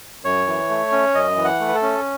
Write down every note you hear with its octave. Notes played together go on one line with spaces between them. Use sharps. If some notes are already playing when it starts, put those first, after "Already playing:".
F#2 C#5
E3
A3
C#4
F#2 D#5
E3
F#5
A3
B4
A4
C#4